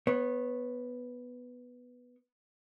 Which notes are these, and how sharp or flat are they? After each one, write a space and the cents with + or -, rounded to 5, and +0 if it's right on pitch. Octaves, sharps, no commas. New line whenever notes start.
B3 +0 C#5 -25